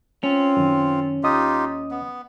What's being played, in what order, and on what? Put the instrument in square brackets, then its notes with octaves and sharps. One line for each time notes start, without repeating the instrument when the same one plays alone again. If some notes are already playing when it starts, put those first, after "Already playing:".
[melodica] C4 F4 [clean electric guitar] C#4
[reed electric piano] F#2 D#3
[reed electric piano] D#2 D#5 D#6 [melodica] D#4 F4 G4
[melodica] B3